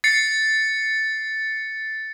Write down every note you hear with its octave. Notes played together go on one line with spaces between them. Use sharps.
A6 C7 C#7